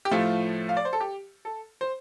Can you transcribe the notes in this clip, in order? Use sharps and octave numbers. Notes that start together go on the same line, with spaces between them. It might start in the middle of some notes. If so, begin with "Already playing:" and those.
G4
A2 F3 A3 F4
F5
D5
C5
A4
G4
A4
C5